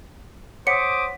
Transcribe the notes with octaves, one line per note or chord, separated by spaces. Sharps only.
C5 C#5 F#5 D6 D#6 B6 C#7